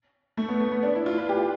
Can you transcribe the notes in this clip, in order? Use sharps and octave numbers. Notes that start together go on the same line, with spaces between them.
A3
B3
A3
B3
D4
E4
F4
B4
G4